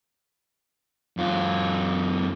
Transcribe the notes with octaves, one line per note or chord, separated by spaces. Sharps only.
F#2 F4